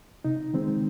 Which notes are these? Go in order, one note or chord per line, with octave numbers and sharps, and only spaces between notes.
C3 D#4
D#3 G#3 C4